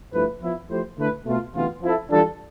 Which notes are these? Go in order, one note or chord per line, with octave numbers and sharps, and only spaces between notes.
G2 F3 A3 E4 B4
F3 B3 E4
F3 A3 E4 G4 C5
D3 A3 E4 B4
B2 A3 C4 F4
D2 C3 E3 B3 F4
F3 C4 E4 A4
E3 G3 D4 F4 A4